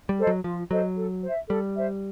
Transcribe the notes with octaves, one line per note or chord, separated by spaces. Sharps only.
G3
A4 C5 D#5
F#3
F3 F4
F#3 A4 C5 D#5
A4
C5 E5
G3 A4
C5 E5